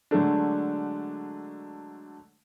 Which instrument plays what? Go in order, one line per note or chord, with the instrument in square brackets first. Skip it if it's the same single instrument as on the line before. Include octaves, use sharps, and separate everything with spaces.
[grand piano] D3 F#3 G#3 A3 D4